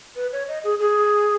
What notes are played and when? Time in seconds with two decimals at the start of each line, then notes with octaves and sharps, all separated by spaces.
0.16 B4
0.32 C#5
0.48 D#5
0.64 G#4
0.79 G#4